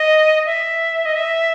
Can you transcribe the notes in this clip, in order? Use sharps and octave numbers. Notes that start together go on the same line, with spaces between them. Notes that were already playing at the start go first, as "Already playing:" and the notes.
Already playing: D#5
E5
D#5
E5